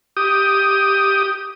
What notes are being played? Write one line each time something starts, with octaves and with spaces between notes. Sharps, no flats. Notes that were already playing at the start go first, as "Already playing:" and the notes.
G4 D#6